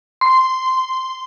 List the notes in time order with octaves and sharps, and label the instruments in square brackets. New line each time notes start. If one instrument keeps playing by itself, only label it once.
[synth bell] C6